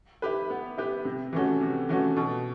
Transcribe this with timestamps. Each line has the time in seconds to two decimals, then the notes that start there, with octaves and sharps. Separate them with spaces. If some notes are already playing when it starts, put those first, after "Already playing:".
0.22 E4 G4 B4
0.50 B3
0.78 E4 G4 B4
1.05 C3
1.33 E3 A3 C#4 F#4
1.61 C3
1.89 E3 A3 C#4 F#4
2.16 B2